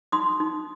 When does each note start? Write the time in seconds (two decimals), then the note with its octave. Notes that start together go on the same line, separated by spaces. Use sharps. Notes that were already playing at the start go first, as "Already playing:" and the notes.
0.12 D#4 C6 D#6
0.40 D#4